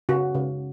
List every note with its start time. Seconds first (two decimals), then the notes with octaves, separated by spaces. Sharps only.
0.09 C#3 F#4
0.35 C#3